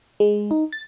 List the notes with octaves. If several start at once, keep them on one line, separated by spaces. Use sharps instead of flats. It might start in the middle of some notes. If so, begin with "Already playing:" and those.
G#3
D#4
A6